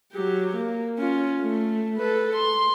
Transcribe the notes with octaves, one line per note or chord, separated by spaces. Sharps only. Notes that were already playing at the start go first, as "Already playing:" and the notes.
F#3 G4
A#3
C#4 F4
A3
A4 B4
C6